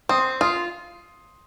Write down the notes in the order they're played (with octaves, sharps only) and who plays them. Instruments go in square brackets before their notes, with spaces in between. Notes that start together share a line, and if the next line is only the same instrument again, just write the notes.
[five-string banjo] C4 [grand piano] C6 D#6
[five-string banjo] F4 [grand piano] C6 D#6